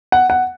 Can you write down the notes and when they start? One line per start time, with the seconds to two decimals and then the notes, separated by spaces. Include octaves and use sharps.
0.12 F#5
0.30 F#5